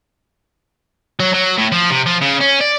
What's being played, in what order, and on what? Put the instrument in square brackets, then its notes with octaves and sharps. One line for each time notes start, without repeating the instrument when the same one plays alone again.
[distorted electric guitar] F#3
F#3
A2
F3
C3
F3
C#3
C#4
D5